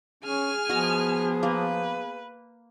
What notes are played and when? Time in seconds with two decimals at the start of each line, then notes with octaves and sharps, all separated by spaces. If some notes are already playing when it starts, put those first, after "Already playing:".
0.24 C#4 G#4 G#5 F6
0.69 F3 B3 F#4 G#4 D#5
1.43 A#3 B4